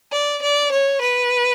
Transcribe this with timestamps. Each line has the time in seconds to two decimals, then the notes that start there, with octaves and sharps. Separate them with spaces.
0.12 D5
0.42 D5
0.72 C#5
1.01 B4